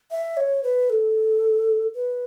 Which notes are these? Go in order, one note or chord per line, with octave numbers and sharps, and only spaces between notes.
E5
C#5
B4
A4
B4